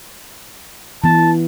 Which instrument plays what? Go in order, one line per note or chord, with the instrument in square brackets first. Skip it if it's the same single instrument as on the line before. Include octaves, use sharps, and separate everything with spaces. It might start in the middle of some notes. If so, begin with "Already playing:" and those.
[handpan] E3 B3 [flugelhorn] A5